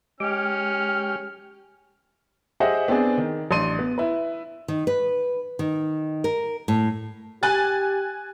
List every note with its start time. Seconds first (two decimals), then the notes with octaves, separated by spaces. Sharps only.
0.20 G#3 C#4 G4 G5 F6
2.60 G4 G#4 C5 D#5 E5 F#5
2.88 B3 C4 D4 G#4
3.18 D#3
3.51 A1 D4 C6 D#7
3.79 B3
3.98 E4 B4
4.68 D#3
4.87 B4
5.59 D#3
6.24 A#4
6.68 A2
7.43 G4 G#5 F#6 A6